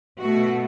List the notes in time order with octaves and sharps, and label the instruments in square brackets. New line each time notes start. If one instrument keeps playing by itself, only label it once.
[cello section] B2 A3 F#4